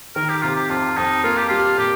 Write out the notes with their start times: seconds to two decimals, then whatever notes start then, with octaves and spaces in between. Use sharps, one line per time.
0.16 D#3 A#4
0.29 G4
0.42 C3 F4
0.56 G4
0.70 F2 F4
0.97 F2 D#4
1.24 A#3 F4
1.37 G4
1.49 G3 F4
1.78 A#2 G4